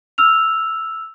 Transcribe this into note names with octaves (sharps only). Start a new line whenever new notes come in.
E6 F6 F7